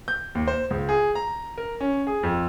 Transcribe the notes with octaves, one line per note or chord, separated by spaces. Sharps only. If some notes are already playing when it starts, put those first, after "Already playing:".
G6
D#2
C5
C#2
G#4
A#5
A#4
C#4
G#4
F2